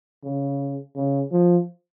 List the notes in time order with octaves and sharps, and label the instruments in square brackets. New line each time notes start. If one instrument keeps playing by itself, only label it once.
[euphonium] C#3
C#3
F3